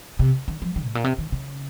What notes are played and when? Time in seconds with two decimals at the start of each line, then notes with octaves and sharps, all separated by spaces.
0.19 C3
0.48 D#3
0.62 F3
0.76 D#3
0.85 A2
0.95 A#2
1.04 C3
1.18 D#3
1.32 C#3